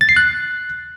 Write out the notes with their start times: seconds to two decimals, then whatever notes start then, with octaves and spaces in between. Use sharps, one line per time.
0.01 A6
0.09 C7
0.16 F#6